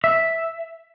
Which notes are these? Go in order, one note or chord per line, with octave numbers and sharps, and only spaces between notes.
E5